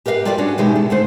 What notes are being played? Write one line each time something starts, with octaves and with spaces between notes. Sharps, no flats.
G4 A#4 B4 E5 F5
G3 F4 F#4 A4 D5
C#4 D4 F#4
B2 D#3 G#3 E4 G4
A4
D3 A3 C5